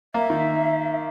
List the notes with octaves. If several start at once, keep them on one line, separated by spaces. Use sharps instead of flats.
A#3 E5
D#3